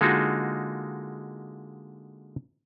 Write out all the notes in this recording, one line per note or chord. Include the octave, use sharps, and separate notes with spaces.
D3 G#3 A#3 D#4 F4 F#4